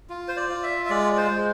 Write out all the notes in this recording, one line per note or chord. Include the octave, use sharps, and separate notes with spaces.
F4
C5
D5
F4
E5
E5
G#3 D5
D5
C5
G#3